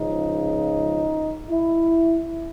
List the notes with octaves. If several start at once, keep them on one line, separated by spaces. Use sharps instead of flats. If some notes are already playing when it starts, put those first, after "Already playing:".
Already playing: C#2 C#3 F3 D#4
E4